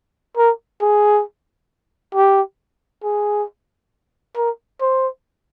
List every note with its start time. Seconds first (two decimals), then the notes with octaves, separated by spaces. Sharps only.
0.38 A#4
0.82 G#4
2.15 G4
3.04 G#4
4.37 A#4
4.81 C5